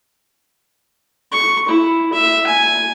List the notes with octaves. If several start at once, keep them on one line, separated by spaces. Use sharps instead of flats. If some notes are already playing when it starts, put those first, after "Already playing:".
C#6
E4
E5
G#5